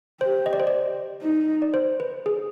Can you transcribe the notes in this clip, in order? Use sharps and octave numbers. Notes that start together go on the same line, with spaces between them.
G4 C5
D#5
D5
C5
D5
D#4
D5
C5
B4
G#4